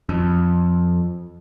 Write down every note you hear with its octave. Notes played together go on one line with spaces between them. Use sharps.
F2